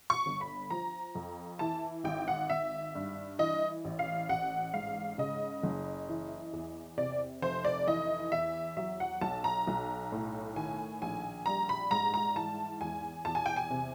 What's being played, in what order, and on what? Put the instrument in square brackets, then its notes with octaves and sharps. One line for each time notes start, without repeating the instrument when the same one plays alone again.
[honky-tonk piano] C#6
G1
B5
F3 A#5
F2
E3 A5
G#1 G5
F#5
G#1 E5
G2
E3 D#5
A1
F5
A1 F#5
G#2 F5
C#3 D#5
F#1
E3
E2
C3 D5
F1 C5
D5
E3 D#5
E2 E5
F#3 E5
F#5
B1 A5
A#5
B1
A2
D#3 G#5
A#1 G#5
G3 A#5
B5
G#2 A#5
A#5
E3 A5
E2 G#5
E2 A5
G#5
G5
G#5
C3